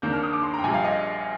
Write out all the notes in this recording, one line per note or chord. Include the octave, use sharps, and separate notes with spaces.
D#2 D#3 A#3 D4 G6
F6
D#6
D6
C6
G5 A#5
A#1 A#2 G3 G#5
F5
D#5